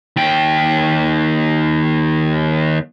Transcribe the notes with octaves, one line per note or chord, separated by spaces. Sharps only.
D#2 G5